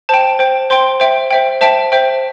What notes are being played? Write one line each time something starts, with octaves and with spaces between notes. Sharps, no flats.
C5 G5 A5
C5 G5
C5 G5 C6
C5 E5 G5
C5 E5 G5
C5 E5 G5 A5
C5 E5 G5